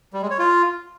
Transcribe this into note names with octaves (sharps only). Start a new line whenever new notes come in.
G3
G#3
C#5
F4